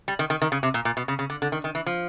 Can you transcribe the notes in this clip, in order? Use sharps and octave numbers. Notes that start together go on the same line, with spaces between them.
G3
D#3
D#3
D#3
C#3
C3
A#2
A#2
B2
C#3
C#3
D3
D3
D#3
D#3
E3
F3